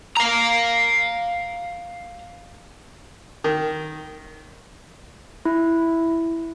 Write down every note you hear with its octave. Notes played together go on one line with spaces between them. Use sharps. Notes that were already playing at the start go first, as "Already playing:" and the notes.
F5 A#5
D#3
E4